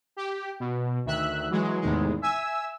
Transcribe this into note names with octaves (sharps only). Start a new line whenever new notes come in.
G4
B2
D2 D#3 E5 F#6
E3 F#3 G#3
E2 A2 C3 D#3 G#3
E5 G#5 E6